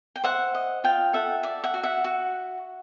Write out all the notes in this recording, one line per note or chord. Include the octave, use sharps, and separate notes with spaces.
G5
C5 E5 F#5
D#5
F4 F5 G5
A4 E5 F#5
D5 E5
E5 F#5
F#4
E5 F#5
F#4